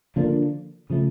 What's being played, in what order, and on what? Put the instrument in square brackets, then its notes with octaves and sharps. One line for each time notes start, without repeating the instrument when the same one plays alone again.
[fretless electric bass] D3 F3 A#3 D4
C#3 F3 A3